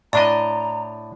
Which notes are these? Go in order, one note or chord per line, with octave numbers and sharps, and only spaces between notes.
A2 D4 D5 D#5 A#5